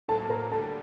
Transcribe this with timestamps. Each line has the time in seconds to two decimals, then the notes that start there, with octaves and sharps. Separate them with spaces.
0.08 A2 F#3 A#3 A4 A5
0.29 A#4 A#5
0.51 D3 G3 A4 A5